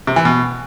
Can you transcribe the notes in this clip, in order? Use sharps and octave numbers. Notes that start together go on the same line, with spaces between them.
C3
E3
B2